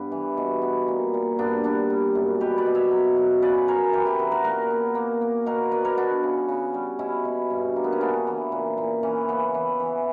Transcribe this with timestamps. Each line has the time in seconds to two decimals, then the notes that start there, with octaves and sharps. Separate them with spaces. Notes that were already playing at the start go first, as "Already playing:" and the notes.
Already playing: G2 B3 D4
0.12 E3
0.37 B2
0.62 B3
0.88 A#2
1.14 A#2
1.38 G2 B3 D4
1.63 G2 B3 D4
1.90 G3
2.15 F#2
2.41 B2 G4 B4
2.58 B4 D5
2.66 B2
2.75 C#5 E5
2.91 F#3
3.17 F#3
3.42 C#3 B4 D5
3.68 C#3 A#4 C#5
3.93 E3 G4 B4
4.06 E4 G4
4.19 B3 F#4 A#4
4.32 F#4 A#4
4.44 A#2 F#4 A#4
4.70 B3
4.95 A#3
5.21 A#3
5.46 B2 F#4 A#4
5.71 B3 B4 D5
5.85 A#4 C#5
5.97 B3 D4 F#4
6.23 C#3
6.48 C#3
6.74 G3
6.99 B2 C#4 E4
7.25 B2
7.50 G2
7.76 A#3
7.84 B3
7.92 C#4
8.01 C#3 B3 D4
8.27 E3
8.52 A#2
8.78 A#2
9.03 E3 C#4
9.29 C#3 B3
9.54 E3
9.80 E3